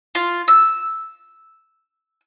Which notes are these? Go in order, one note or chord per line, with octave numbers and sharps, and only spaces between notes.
F4
E6